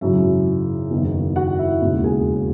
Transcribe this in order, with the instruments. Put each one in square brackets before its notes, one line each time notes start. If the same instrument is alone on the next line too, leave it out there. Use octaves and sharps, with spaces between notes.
[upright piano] G#1 F#2 C#3 F#3 E4 E5
F#1 E2 D#3
F#4 F#5
E4 E5
E1 D#2 C#3
G#4 G#5